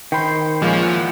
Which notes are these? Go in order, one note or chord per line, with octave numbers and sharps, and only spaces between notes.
D#3 C5 G5 B5
A#2 F3 G#3 A#3 C#4
E4 F#5